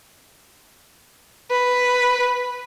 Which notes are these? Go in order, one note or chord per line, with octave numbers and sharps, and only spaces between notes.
B4